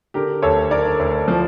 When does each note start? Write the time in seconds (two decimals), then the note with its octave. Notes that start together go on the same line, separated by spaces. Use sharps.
0.14 D3 G4 A#4
0.42 D2 A4 C#5
0.71 D3 A#4 D5
0.99 D2
1.28 F3